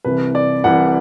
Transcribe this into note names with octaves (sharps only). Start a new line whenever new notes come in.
C2 C3 E3 B4
D5
C2 C3 E3 F#5